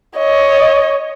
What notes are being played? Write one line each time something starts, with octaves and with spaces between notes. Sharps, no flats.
C#5 D#5